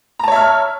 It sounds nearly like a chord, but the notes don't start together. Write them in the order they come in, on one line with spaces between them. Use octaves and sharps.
A#5 A5 C#5 E5 F6